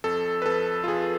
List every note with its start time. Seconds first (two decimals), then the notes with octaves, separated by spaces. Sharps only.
0.04 F2 A4
0.42 B4
0.46 F2 A4
0.84 F4
0.88 F2 G#4